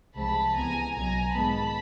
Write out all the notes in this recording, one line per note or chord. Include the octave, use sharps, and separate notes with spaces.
C2 C3 F3 G#3 C4 A5 B5
C#2 C3 E3 G#3 B3 G#5 A#5
B1 B2 F#3 G#5 A#5
G#2 D#3 G#3 B3 A5 B5